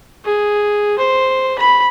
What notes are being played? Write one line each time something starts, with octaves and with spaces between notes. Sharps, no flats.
G#4
C5
B5